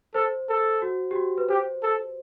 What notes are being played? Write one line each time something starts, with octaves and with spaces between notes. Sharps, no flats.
A4 C5
A4
F#4
G4
F#4
B4
G4 C5
A4